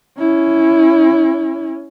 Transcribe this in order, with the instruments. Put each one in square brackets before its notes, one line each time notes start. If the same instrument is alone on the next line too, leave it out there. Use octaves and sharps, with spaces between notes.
[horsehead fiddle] C#4 E4